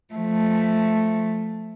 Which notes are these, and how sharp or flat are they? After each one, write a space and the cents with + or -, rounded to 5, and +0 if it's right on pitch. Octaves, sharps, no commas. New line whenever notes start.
F3 +0 A3 +0